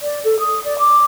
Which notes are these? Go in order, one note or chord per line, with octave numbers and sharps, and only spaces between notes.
D5
A4
D#6
D5
D6